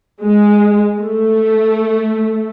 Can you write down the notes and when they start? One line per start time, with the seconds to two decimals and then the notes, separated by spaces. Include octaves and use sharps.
0.23 G#3
1.00 A3